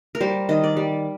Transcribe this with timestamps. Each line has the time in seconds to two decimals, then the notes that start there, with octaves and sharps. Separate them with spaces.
0.15 A#4
0.21 G3 C5
0.49 D#3 D#5
0.64 D5
0.77 G3